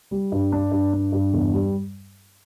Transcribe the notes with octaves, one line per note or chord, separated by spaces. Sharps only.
G3
G2
D4
G2
D4
G2
E2
G3